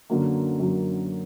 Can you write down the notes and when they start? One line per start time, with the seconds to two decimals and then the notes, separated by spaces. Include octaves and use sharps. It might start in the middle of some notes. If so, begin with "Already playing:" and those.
0.10 F#2 D3 F#3 A#3
0.60 F#2 D3 F#3 A#3